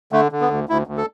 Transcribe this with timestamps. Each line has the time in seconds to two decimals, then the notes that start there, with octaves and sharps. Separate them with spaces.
0.12 D3 A3
0.32 D3
0.41 B3
0.50 D2
0.69 D2 E4
0.87 D2
0.97 A4